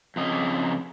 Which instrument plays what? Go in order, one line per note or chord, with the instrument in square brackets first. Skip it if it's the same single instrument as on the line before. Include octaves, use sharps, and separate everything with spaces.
[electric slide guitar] F2 C#3 D#5